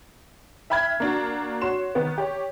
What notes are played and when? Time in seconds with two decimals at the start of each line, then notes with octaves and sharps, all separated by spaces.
0.70 E5 G5 B5 F6 G#6
1.00 A#3 D4 F#4
1.61 F#4 C#5 C6 E7
1.95 D#3 B3
2.18 G4 C#5